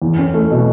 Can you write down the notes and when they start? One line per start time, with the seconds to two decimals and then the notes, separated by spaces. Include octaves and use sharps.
0.02 E2
0.18 C#4
0.34 A3
0.51 B2